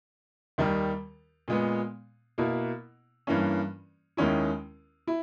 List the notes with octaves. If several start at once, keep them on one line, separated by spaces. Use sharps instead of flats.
D#2 D#3 G3
A#2 G#3 B3
B2 A#3 E4
G2 E3 A#3 C#4
D#2 D#3 G#3 C#4 E4
E4